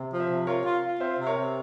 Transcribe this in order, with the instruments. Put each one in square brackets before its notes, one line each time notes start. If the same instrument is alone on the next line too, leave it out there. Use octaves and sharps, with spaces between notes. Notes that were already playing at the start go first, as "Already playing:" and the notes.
Already playing: [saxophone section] C3
F3
[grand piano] C5 E5
[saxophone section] C3
[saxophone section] F4 [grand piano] A#4 C#5
[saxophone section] F4
F4
[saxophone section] C4 [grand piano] C5 E5
[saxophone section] C3
[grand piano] A#4 C#5
[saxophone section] C3